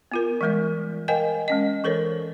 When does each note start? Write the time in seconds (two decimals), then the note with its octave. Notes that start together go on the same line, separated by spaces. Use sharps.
0.12 B3 F4 A#4
0.41 E3 G3 G#3 A#4 D5
1.08 A#4 C5 D#5 F5 G5 G#5
1.48 G#3 C#4 D#5
1.84 E3 A4 A#4 C5 C#5